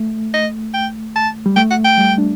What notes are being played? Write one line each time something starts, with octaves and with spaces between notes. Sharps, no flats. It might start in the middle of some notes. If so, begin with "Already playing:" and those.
Already playing: A3
D#5
G5
A5
G3
A3 G5
F#5
G5
G3
D4